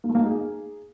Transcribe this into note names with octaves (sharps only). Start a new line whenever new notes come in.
A#3
A3
A#3
D#4
G#4